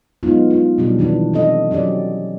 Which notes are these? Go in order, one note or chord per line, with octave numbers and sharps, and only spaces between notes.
F#3 G#3 B3 D4 D#4 F4
G#3 F4
B2 F#3 G3 D4 G4
D#3 E3 D4
C4 D4 A4 D#5
F#3 C#4 G4 D5